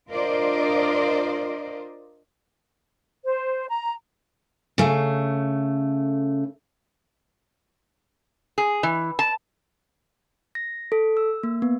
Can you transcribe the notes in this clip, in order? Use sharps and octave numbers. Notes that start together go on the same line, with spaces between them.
D4 F4 A#4 C5 D5 D#5
C5
A#5
C#3 A3
G#4
E3
A5
A#6
A4
E6
A#3
B3